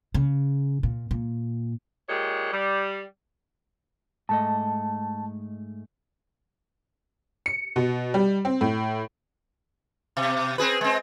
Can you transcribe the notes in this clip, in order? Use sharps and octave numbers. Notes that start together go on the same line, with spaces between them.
C#3
A#2
A#2
A#2 G#3 G4 C#5
G3
G#2 A3 D#5 A5
C#7
B2
G3
C4
A2
B2
C4 G#4 B4
G#3 C4